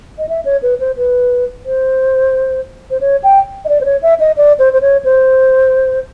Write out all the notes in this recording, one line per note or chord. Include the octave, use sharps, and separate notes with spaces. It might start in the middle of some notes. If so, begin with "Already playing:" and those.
D#5
E5
C#5
B4
C5
B4
C5
C5
C#5
G5
D#5
D5
C5
C#5
E5
D#5
D5
C5
C5
C#5
C5